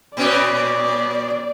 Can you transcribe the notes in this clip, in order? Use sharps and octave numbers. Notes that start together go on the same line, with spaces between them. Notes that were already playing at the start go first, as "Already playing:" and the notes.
A#2 B3 C#4 D5